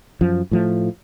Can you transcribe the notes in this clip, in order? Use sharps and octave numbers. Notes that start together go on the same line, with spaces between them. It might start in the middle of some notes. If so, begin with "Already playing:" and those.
F#2 F3
A2 F3 A3